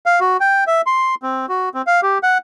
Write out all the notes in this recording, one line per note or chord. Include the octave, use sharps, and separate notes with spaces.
F5
F#4
G5
E5
C6
C4
F#4
C4
F5
G4
F#5